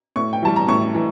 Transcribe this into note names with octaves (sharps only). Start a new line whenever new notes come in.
A2 C#6
G5
E3 G3 A5
A#5
A2 C#6
E3